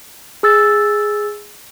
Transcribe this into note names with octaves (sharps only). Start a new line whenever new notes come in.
G#4 E6 A6